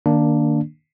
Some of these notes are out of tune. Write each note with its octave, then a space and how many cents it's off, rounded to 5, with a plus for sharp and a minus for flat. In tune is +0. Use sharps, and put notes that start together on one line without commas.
D#3 -20 A#3 +0 D4 +0